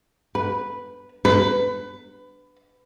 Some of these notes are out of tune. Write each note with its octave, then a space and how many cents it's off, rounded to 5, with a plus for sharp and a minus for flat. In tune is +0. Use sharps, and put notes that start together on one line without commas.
B4 -5
B4 +20